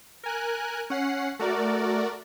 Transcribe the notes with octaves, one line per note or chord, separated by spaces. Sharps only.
A#4 G#5 F#6
C#4 F#5 C7
A3 F#4 A#4 D5